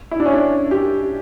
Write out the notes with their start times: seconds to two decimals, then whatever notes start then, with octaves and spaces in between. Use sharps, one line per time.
0.11 E4
0.20 D4
0.26 C#4
0.33 D4
0.71 G4